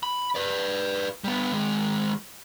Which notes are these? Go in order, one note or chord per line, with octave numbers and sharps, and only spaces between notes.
B5
B4 D5
G3 B3
D#3 G#3